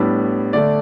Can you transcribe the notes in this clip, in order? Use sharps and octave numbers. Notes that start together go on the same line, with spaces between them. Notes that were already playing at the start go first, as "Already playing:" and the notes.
Already playing: A2 G3 B3 D4
D3 A3 D4 D5